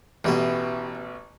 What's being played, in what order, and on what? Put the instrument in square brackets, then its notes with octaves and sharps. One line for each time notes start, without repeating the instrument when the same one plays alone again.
[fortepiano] A1 B2 [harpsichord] E3 G4 G5